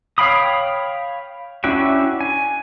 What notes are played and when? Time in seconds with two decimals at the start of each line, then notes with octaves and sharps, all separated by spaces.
0.18 C#5 F5 G5 B5 D#6
1.64 C#4 D4 E4 F#4 G5
2.21 G#5